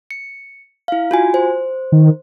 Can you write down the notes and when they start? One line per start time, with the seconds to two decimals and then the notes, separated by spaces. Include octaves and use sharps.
0.11 C#7
0.88 E4 F5
1.11 F4 F#4 G#5
1.34 C5
1.92 D#3